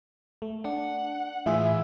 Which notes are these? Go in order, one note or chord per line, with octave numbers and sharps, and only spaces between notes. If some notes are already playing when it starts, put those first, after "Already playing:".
A3
D4 F#5
A2 E3 F4 G#4 E5